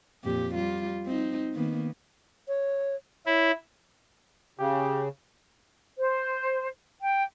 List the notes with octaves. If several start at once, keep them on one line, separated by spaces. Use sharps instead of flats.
F2 A#2 G4
G3 F4
C4 D#4
D#3 A#3 B3
C#5
E4 C#5
C#3 G4
C5
G5